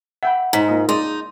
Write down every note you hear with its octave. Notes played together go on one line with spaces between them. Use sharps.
E5 F#5 G5 B5
G#2 A#5 B6
A#3 F4 D#5
G#3 D#4 G#4 D5 C6